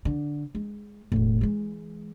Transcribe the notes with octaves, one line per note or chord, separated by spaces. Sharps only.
D3
G#3
E1 A2
E3 G#3